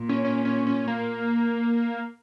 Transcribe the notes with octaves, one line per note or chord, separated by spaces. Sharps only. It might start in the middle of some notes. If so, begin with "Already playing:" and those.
Already playing: A#2
C#4
C#4
C#4
C#4
A#3